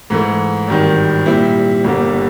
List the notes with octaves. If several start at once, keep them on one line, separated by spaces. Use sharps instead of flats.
G#2 E3 A3
G#1 G2 D#3
A#2 G3 C4 E4
G1 G2 D3 G3 A#3